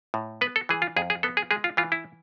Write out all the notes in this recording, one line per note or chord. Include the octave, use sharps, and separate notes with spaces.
A2
B3 B4
A4
E3 G#4
F4
F2 G#4
G#4
B3 A4
G#4
G#3 G#4
F4
E3 F4
E4